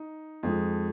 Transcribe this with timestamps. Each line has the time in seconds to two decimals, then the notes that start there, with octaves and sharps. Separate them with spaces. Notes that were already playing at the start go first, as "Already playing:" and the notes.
Already playing: D#4
0.43 F2 F3 G#3